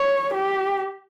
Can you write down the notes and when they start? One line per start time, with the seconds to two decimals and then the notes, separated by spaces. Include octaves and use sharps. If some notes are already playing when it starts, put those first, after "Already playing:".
Already playing: C#5
0.34 G4